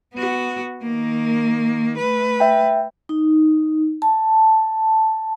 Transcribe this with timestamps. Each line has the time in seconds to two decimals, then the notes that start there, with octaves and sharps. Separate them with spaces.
0.14 B3 F#4
0.82 D#3 A#3
1.98 A3 B4
2.40 E5 G5
3.09 D#4
4.02 A5